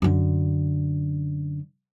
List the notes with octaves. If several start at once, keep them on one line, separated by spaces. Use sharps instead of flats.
F#2 D3